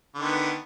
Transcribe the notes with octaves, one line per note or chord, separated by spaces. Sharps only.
D3 D#3 B3